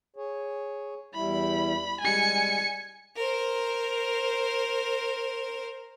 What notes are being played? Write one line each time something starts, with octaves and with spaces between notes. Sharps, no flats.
G#4 C#5
E2 G3 E4 B5
G3 G#3 G#5 C#7
A#4 C5